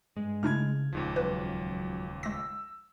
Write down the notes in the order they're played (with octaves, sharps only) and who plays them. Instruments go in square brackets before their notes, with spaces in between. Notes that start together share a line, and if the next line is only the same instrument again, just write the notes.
[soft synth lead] G2 [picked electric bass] G#3
[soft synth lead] C#3 [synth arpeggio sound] A3 D4 E4 [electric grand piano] F6 G#6
[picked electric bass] D#1 [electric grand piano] C#2 G#2 F3
[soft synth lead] F#3 [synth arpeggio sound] B4
[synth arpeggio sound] G#3 A#6 [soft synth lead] E6